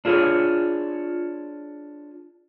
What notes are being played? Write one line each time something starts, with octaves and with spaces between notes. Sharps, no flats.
D4 F4 G#4 A#4 C#5